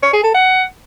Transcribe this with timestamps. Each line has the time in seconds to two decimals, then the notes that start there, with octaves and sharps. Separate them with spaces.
0.03 C#5
0.13 G#4
0.24 A4
0.34 F#5